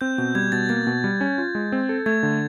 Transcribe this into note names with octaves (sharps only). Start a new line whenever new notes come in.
C4 G6
B2 G6
G3 G#6
B2 A6
A#3 A6
B2
G3
C#4
F4
G#3
C4
A4
A3 G#6
D3